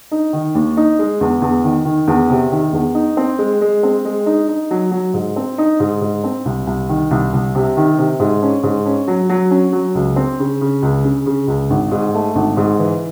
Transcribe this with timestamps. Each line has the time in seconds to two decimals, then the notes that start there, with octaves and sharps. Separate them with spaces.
0.11 D#4
0.33 D#3
0.55 D#2
0.77 D#4
0.99 G#3
1.21 E2
1.42 E2
1.64 D#3
1.85 D#3
2.08 E2
2.30 C3
2.52 D#3
2.73 E2
2.95 D#4
3.17 C4
3.39 G#3
3.61 G#3
3.83 C4
4.05 G#3
4.26 D#4
4.49 D#4
4.71 F#3
4.91 F#3
5.14 G#2
5.36 C4
5.58 D#4
5.80 G#2
6.01 G#2
6.24 C4
6.45 C2
6.67 C2
6.89 D#3
7.11 C2
7.33 C2
7.55 C3
7.77 D#3
7.98 C3
8.19 G#2
8.42 C#4
8.63 G#2
8.86 C#4
9.08 F#3
9.30 F#3
9.51 C#4
9.73 F#3
9.95 C#2
10.16 C4
10.39 C#3
10.61 C#3
10.82 C#2
11.04 C#3
11.26 C#3
11.48 C#2
11.70 G#1
11.91 G#2
12.14 A3
12.35 G#1
12.57 G#2
12.79 E3